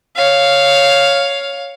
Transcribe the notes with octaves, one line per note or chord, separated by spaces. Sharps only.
C#5 F5